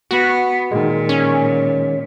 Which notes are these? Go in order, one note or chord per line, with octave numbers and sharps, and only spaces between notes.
B3 F#4
A#2 D#3 G#3
C#4